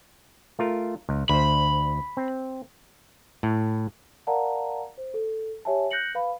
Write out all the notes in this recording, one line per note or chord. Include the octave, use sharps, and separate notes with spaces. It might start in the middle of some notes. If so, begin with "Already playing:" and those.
A3 F4 A#4
C#2
D2 C5 B5
C4
A2
A#4 D5 F5 F#5 A5 A#5
C5
A4
G4 C#5 E5 G#5 A5
F#6 G6 A#6 C#7 F#7
B4 F5 B5